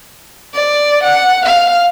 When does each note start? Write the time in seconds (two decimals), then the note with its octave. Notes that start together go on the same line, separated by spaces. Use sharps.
0.54 D5
1.03 F#5
1.45 F5